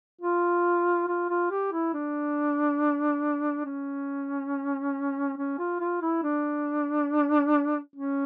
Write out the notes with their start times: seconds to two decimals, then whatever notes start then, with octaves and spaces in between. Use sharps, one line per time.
0.21 F4
1.08 F4
1.29 F4
1.51 G4
1.72 E4
1.93 D4
3.65 C#4
5.37 C#4
5.58 F4
5.80 F4
6.02 E4
6.23 D4
7.95 C#4